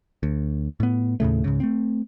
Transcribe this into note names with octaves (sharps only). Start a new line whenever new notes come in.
D2
A2 B3
D#2 A2 C#3 A3
C#2 G#2 C#3
A3 C4